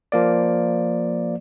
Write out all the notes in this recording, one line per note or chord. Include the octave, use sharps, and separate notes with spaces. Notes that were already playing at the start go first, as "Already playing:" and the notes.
F3 A#3 D5